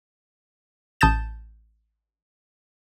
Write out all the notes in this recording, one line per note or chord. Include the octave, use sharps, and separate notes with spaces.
A1 A5 D#6 G6 A6 E7